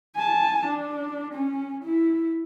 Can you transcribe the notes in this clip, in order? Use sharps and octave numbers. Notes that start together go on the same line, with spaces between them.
G#5 A5
D4
C#4
E4